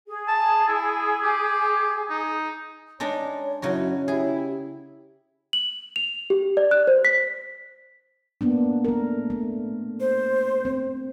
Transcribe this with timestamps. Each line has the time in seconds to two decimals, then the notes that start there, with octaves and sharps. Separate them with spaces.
0.07 G#4
0.28 A5
0.68 E4
1.23 G4
2.10 D#4
3.00 G#3 D4 D#4 C#5
3.62 F#2 C#3 F#3 D#4 E4 F#4
4.08 E4 G4 G#4
5.53 F#7
5.96 F7
6.30 G4
6.57 D5
6.71 F#6
6.87 C5
7.05 B6
8.41 A#3 B3 D4
8.85 A3 A#4
9.30 A3
10.00 C5
10.65 C4